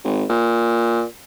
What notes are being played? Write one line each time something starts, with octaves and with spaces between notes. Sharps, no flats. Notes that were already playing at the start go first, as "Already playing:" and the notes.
G#1
A#2